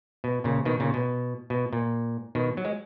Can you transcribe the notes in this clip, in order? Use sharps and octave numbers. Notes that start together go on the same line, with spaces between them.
B2
A#2 C#3
B2 D#3
A#2 C#3
B2
B2
A#2
B2 D#3
F#3
G#3